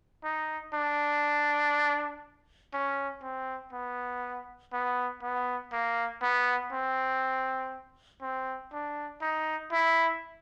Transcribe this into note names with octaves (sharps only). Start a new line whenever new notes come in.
D#4
D4
C#4
C4
B3
B3
B3
A#3
B3
C4
C4
D4
D#4
E4